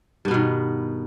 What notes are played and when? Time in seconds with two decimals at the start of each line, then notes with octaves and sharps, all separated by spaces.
0.25 G2
0.28 B3
0.31 B2
0.34 D#3